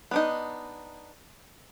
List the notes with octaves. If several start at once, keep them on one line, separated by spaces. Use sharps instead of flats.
B3 D4 D#4